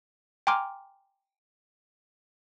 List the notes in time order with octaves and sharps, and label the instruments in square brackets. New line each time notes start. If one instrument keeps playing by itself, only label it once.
[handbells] G5 G#5 A#5 C6 D6 F6